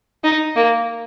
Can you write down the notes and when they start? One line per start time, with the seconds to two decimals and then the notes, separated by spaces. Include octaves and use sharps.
0.24 D#4
0.56 A#3